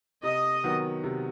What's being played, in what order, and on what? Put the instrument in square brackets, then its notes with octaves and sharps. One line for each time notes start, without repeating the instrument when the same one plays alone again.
[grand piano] C3 [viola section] D#5
[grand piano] D#3 F#3 B3
C3